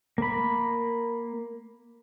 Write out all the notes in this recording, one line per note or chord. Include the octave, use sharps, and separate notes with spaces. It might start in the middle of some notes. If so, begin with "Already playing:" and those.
A#3 B5